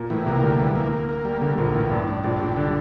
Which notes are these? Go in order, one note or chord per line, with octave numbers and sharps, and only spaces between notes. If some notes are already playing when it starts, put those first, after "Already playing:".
Already playing: A#2 A#3
A2 E3 A3
C2 C3 A#3
D2 D3 G3
E3
A#3
A#3
A#3
G3
D2 D3 A#3
A#1 A#2 A#3
A2 E3
G2 D4
A2 D4
A#1 A#2 D4
A#1 A#2 G3
D3 D4